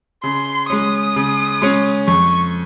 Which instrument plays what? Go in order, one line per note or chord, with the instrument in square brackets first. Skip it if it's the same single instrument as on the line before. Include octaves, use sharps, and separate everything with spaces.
[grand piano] C#3 [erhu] C6
[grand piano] G#3 C#4 [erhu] D#6
[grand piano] C#3
G#3 C#4
[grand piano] F2 [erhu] C#6